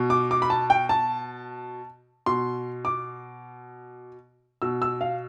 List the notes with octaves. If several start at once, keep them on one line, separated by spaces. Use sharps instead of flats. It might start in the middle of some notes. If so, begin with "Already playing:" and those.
Already playing: B2
D6
D6
B5
A5
G5
A5
B2 C6
D6
B2 E6
E6
F5